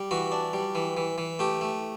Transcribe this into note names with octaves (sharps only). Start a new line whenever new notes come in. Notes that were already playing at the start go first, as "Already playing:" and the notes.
Already playing: G3
E3 F#4
D4
G3
E3
E3
E3
A3 G4
A3